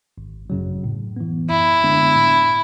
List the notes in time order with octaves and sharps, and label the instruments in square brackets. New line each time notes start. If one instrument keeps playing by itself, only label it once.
[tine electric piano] G#1
F#2 C#3 F#3
A2
E3 B3
[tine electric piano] F#2 [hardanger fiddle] E4
[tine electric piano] D3 G#3 B3 D4
A2